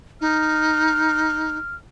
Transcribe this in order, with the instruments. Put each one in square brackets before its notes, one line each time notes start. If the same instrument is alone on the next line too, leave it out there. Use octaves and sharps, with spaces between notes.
[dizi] D#4 [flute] F6